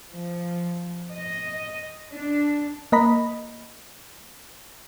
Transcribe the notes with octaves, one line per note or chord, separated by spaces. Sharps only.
F3
D#5
D4
A#3 D#5 A#5 B5